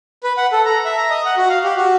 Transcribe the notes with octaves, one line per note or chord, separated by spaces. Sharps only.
B4
F#5
A4
A#5
E5
A#5
D#5
F#5
F#4
F5
G4
F#4